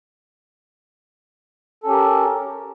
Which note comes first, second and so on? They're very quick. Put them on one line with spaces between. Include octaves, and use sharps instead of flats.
A4 C#4 G4 A#4